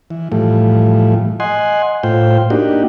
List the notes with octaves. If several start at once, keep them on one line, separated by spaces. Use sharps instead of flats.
E3
A2 E3 F3 G3 A3
D#5 F#5 G#5 C6
A2 F4 C5 G5
A#3 D4 D#4 F#4 G4